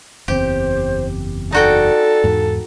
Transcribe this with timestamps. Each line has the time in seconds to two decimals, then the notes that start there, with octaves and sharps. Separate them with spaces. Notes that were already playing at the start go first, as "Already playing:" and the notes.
0.28 F#1 E2 C4 G4 C5
1.52 D#4 F#4 A4 D5 G5
2.24 E2 G#2